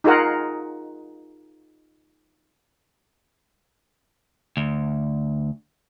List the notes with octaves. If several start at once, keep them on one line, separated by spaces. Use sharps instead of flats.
D#4 F4 G#4 A#4 F#5
D2